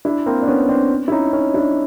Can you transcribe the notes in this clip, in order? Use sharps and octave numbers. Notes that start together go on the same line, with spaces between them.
D4 E4
A#3 C4
D4
B3 C#4
C4 D4
E4
C#4 D#4
C#4 D#4
D4 E4